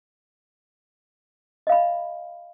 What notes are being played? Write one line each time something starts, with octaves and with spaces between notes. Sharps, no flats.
D#5 F5 B5